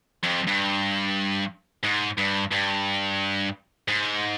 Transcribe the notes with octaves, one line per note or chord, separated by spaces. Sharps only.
F2
G2
G#2
G2
G2
G#2